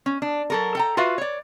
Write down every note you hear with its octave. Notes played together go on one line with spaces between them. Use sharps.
C#4
D4
F#3 A4 A#4
A4 G5 A#5
F4 F#4 B4 E5 F5
C#5 D5